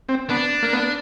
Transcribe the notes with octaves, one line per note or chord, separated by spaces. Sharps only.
C4
B3 D4
A#3
B3